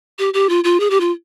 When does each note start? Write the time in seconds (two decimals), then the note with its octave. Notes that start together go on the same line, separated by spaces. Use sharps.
0.19 G4
0.34 G4
0.49 F4
0.64 F4
0.80 G#4
0.90 G4
1.00 F4